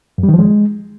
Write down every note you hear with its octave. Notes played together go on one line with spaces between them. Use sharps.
F#2
G3
D#3
F3
G#3